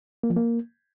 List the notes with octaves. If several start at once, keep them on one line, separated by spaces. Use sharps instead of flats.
A#3
F3
A#3